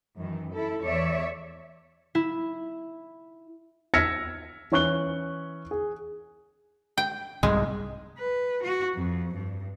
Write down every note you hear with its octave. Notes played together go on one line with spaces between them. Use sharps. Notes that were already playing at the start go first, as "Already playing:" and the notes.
F#2 D#3 E3
E4 A4
E2 C#5 D5 E5
E4
E6 F6 G#6 A#6 B6 C#7
E3 C#4 C#6 F#6 G7
G#4
G5
C2 G#2 G#3
B4
F#4
F2
G2